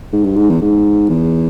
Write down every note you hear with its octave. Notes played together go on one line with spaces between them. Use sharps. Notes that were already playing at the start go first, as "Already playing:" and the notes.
G#2
G2
G#2
E2
G#2
E2